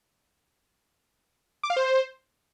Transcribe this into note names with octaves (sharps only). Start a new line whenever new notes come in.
D6
F5
C5